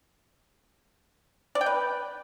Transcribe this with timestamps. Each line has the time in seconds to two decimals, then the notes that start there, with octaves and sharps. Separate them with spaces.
1.55 D5
1.61 G5
1.66 B4